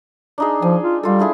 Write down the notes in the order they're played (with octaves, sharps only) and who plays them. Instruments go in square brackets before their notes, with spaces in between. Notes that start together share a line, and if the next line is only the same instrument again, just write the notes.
[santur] D4 D#4 G#4
[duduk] F3 [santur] G#5
[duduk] F4
[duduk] G3 [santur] F4 A4
[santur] D4 E4 G#4